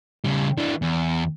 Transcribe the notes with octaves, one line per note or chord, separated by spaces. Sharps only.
C#3 G3
E3 D4
E2